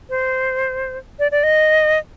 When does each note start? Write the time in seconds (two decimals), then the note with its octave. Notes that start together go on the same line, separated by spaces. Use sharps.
0.10 C5
1.19 D5
1.32 D5
1.43 D#5